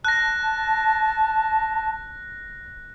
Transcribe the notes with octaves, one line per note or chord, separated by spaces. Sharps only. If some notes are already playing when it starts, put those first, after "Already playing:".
A5 F#6 A#6